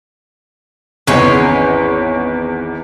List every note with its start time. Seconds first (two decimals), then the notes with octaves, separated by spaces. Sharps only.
1.07 G#1 E2 G#3 C#4